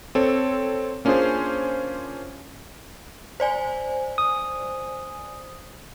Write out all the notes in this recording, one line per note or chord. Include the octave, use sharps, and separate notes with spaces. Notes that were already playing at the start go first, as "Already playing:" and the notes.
C4 A4 C#5
A#3 C#4 D4 F4 G#4 C5
C5 D5 G#5
D#6